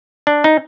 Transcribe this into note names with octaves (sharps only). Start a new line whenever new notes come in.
D4
D#4